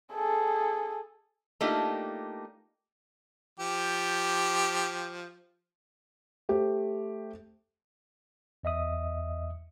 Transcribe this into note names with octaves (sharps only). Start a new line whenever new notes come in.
G#4 A4
A3 A#3 D4 D#4 F4 G4
F3 G4
A3 G4 C5
E2 D#5 E5 D#6